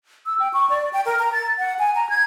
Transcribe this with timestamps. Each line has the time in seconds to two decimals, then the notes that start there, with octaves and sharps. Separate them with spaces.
0.26 E6
0.40 G5
0.53 C#6
0.70 D5
0.93 G5
1.05 A#4
1.19 A#5
1.33 A6
1.58 F#5
1.79 G#5
1.96 A#5
2.10 G#6